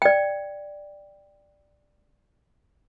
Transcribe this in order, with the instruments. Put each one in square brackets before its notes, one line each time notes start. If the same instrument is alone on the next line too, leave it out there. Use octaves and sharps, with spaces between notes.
[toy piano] D5 G5